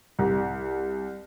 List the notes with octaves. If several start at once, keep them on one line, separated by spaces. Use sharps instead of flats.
C2